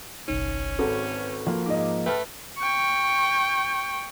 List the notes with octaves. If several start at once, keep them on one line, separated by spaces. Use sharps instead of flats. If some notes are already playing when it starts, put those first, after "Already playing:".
G1 C2 C#4 D#4
G#1 F#4 A4 B4
F3 A#3
G#2 D#5 D6
A3 B4 G5 A5 F6
G5 C#6